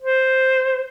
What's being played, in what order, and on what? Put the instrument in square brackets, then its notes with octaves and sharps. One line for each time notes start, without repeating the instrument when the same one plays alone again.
[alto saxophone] C5